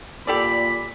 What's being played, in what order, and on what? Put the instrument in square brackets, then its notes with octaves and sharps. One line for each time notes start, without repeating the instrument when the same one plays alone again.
[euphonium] A#2 [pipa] G4 A4 D5 [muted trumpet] B5